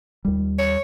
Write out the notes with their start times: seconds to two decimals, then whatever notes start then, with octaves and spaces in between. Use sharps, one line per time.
0.25 D#2 G3
0.58 C#5